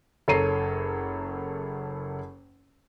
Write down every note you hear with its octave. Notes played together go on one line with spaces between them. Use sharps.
F#1 A4 C#5 A#5 C7 D#7